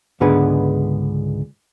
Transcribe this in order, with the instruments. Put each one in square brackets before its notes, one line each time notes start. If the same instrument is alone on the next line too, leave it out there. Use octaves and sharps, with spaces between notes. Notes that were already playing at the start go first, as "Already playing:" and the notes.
[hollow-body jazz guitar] C#2 G#2 D3 B3 G#4 B4